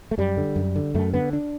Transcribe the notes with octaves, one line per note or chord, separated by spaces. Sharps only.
A3
F#2 G3
D3
F#2
D3
F#2 A3
D3 B3
D4